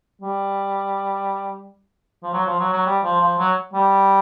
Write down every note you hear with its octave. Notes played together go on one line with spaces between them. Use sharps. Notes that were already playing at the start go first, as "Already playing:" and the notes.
G3
F3
F#3
F3
F#3
F#3
G3
F3
F3
F#3
G3